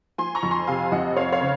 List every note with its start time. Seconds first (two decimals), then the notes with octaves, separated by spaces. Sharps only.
0.18 F3 G#5 C6
0.35 A#5 C#6
0.43 F2
0.51 G#5 C6
0.67 C3 F5 G#5
0.92 F2 D#5 F#5
1.16 C4 C#5 F5
1.32 C#5 F5
1.41 C#3